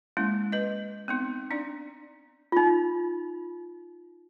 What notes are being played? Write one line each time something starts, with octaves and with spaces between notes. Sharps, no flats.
G#3 A#3 C#4 E4
B4 D#5
B3 C4 D#4
D4 D#4 D5
D#4 F4